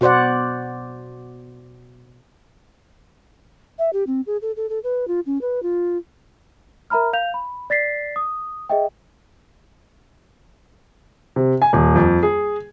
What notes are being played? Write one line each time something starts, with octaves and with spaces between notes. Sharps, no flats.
B2 F#4 C5 D5 F#5
E5
G4
C4
G#4
A4
A4
A4
B4
F4
C#4
B4
F4
A#4 E5 A#5 B5 F6
F5 G6 F7
B5
D5 A6 B6 C7
D#6
G#4 D#5 E5 G5
C3
G#5
D#1
F2
G#4